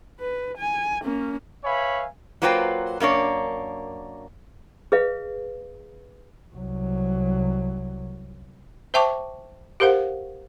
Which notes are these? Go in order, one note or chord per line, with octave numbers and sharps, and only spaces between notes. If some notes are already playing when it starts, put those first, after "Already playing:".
B4
G#5
A#3 C#4
B4 C#5 E5 F5 G#5 B5
F#3 A#3 F4 B4 C5 G5
F#2 A#3 D4 C#5
G#4 B4 D#5 F5
C2 F#3
C5 E5 G5 A5 C#6 D6
G4 A#4 C5 F5 F#5